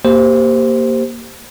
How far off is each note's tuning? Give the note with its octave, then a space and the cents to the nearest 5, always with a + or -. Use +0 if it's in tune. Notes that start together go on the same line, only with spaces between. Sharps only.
A#3 +0 G4 +0 C5 +0